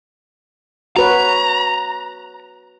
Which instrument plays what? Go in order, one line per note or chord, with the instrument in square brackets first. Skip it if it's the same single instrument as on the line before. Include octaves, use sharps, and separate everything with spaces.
[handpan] F#4 B4 C#5 [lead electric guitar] A#5